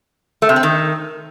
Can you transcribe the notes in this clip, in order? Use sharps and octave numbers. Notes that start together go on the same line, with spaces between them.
A3
C3
C4
D#3